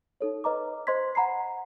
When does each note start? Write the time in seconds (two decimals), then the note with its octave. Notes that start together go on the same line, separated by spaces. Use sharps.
0.21 D#4 A4 C#5
0.44 B4 D#5 A#5 D6
0.87 C5 D#5 C6 G#6 B6
1.15 F#5 A#5 B5 C7